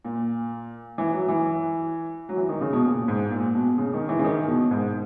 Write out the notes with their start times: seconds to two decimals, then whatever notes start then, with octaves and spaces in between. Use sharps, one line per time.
0.05 A#2
0.98 E3
1.13 F#3
1.28 E3
2.29 F#3
2.37 E3
2.49 D#3
2.61 C#3
2.73 B2
2.85 A#2
3.08 G#2
3.30 A#2
3.55 B2
3.78 C#3
3.93 D#3
4.09 E3
4.19 C#3
4.25 D#3
4.48 B2
4.71 G#2